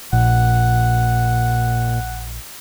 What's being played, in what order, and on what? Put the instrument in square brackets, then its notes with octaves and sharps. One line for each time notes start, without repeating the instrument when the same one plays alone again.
[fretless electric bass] A#1 [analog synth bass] A#2 [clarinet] F#5